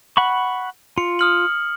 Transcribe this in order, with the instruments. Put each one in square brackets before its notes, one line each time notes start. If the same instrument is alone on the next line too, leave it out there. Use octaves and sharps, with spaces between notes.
[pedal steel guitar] F#5 B5 C#6
[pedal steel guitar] F4 [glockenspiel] C#7
[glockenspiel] D#6 F6 F#7